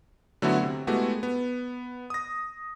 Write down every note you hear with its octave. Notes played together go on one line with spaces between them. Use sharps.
D3 F#3 A3 B3 E4 F#4
C3
G#3 A3 B3 E4 F#4 G4
B3
D#6 A#6